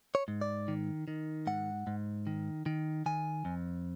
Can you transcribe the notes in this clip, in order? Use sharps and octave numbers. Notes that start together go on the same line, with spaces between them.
C#5
G#2
D5
D#3
D#3
G#2 F#5
G#2
D#3
D#3
D#3 G#5
F2